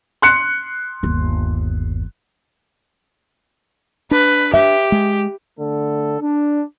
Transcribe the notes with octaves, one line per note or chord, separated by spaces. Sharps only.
C6 F#6 C#7
G1 D#2
D4 B4
G4 E5
G#3
D3 A3 A4
D4